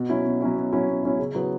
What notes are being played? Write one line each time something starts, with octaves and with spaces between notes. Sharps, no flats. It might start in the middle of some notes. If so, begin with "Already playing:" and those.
Already playing: B2
F#3 C#4 E4
B2
F#3 C#4 E4
B2
F#3 C#4 E4
B2
F#3 C#4 E4
C#3
F#3 B3 E4